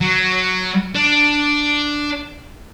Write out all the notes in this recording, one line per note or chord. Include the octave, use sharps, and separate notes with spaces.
F#3
D4